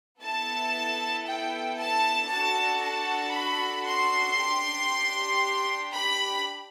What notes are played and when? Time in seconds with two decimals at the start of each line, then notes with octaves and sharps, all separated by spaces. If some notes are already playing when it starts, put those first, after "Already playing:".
0.21 B3 E4 A4 A5
1.25 G5
1.77 A5
2.29 D4 F#4 A4 A5
2.81 A5
3.32 B5
3.85 C6
4.37 D4 G4
5.91 B5